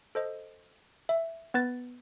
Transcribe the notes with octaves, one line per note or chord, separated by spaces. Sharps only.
A4 C5 D#5
E5
B3 B4 A6